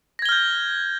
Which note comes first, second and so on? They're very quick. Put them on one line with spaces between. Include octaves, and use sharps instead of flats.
A#6 G#6 G7 F6 G6